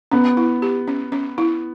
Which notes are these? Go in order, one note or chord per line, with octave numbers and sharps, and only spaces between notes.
B3 C#4
E4
G4
C#4
C#4
E4